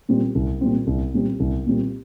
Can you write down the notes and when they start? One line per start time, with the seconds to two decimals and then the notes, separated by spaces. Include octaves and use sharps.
0.09 A#2 G3 C4
0.35 C2
0.61 A#2 G3 C4
0.87 C2
1.14 A#2 G3 C4
1.40 C2
1.67 A#2 G3 C4